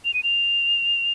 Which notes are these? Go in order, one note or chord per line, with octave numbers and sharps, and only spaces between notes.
F7
D#7
F7